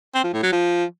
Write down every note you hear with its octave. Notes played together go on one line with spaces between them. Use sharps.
C4
F3
A2
F#3
F3